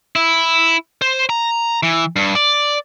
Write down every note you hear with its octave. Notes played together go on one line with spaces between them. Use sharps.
E4
C5
A#5
E3
G2
D5